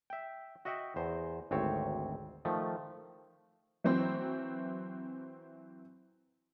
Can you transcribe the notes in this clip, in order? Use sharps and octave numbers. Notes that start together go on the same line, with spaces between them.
E5 G5
F#4 D#5 E5 F#5 G5
E2 C5
G#1 D2 C4 C#5
D#3 F3 A3
E3 F#3 C4 C5